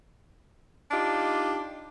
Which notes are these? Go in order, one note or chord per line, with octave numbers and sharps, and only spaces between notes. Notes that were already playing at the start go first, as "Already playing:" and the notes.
D4 D#4 F4 G4